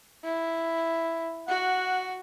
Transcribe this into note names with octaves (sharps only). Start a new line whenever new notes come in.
E4
F#4 F#5